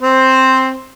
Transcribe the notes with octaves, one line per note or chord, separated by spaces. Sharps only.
C4 C5